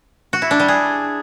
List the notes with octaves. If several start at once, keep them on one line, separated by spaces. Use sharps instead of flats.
F#4
E4
D4
G3
G#4